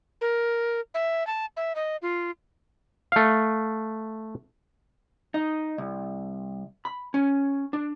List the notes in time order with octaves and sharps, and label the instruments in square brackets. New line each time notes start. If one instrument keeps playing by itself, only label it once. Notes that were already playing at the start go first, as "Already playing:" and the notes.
[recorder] A#4
E5
A5
E5
D#5
F4
[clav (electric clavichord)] A3 F5
[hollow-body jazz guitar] D#4
C2
B5
C#4
D4